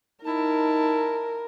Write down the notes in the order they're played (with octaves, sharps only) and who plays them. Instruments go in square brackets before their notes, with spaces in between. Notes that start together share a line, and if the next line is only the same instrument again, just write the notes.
[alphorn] D#4 [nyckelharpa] E4 A5 [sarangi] A#4